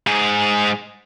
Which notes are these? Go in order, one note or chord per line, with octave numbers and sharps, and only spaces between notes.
G#2 G#4